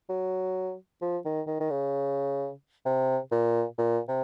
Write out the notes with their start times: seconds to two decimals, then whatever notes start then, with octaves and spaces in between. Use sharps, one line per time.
0.09 F#3
1.02 F3
1.25 D#3
1.47 D#3
1.60 D#3
1.70 C#3
2.86 C3
3.32 A#2
3.78 A#2
4.08 C3